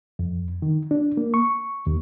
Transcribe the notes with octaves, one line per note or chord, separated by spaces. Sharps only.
F2
D#3
D4
A#3
C#6
D#2